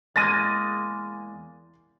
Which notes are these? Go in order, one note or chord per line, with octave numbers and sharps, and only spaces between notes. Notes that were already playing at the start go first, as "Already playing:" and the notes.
E2 G#3 A#3 A6 A#6 D#7